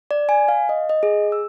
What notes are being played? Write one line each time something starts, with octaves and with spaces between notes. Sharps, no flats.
D5
G#5
F5
D#5
D#5
G#4
E6